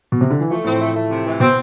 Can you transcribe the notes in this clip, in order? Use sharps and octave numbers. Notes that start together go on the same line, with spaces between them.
B2
C3
D3
E3
F3 A3
A2 C4
A3
A3
C3
E3
B2 C4